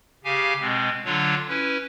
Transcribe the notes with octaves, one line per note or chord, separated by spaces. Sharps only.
C#3 G4 F5 G#5
B2 G#3 C4
D3 F#3 D4 F4 C#5
C#4 E4 B4